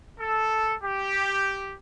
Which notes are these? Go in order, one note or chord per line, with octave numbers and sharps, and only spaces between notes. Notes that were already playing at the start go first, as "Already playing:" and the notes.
A4
G4